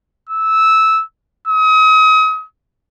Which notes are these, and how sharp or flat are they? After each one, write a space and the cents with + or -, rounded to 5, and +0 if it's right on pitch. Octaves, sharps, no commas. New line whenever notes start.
E6 -15
D#6 +35